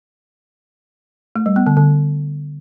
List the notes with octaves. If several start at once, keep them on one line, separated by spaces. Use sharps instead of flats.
A3
G3
B3
D3
D3